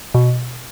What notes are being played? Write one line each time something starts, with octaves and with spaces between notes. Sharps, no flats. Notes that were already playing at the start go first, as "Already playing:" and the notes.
B2